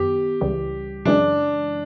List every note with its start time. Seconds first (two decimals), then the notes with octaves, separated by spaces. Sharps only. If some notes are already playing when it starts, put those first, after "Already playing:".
Already playing: F#2 D#3 B3 G4
0.41 C#2 C#3 E3 G3
1.05 F#2 C#3 E3 G#3 D4